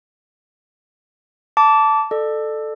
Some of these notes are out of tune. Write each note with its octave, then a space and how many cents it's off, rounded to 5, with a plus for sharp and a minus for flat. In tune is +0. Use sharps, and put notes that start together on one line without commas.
A5 +0 D6 -20
A4 +0 D5 +35